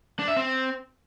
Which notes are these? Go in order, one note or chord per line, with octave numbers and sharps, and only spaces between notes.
D4
E5
C4